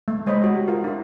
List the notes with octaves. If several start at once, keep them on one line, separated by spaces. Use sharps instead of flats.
A3
G#3 C5 C#5 D#5 B5
F#4 D#5
G4
F4 A#4 F5
D4 E4